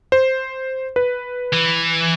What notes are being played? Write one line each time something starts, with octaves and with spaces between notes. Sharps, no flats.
C5
B4
E3